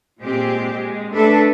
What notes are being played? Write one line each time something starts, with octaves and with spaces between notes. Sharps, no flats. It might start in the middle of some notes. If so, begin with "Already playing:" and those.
A#2 G#3 C4 G4
G#3
A3 D4 A4 B4 E5